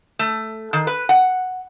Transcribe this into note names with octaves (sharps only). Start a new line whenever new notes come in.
A3
D#3
B4
F#5